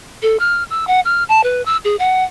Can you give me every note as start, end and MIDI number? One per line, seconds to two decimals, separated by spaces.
0.23 0.37 69
0.40 0.63 89
0.70 0.85 88
0.87 1.00 78
1.05 1.24 89
1.29 1.43 81
1.43 1.64 71
1.66 1.77 88
1.84 1.96 68
1.99 2.24 78